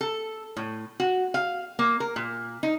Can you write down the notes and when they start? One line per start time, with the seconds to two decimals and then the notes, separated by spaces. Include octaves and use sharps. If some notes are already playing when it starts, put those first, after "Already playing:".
0.01 A4
0.57 A2
1.00 F#4
1.34 F5
1.79 A#3
2.00 A#4
2.16 A#2
2.63 D#4